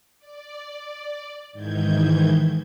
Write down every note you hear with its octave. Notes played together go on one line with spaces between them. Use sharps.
D5
G#2 D#3 E3 G6 G#6